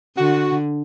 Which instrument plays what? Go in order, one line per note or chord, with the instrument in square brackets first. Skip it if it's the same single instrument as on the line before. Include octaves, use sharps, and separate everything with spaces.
[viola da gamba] D3 [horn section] F#4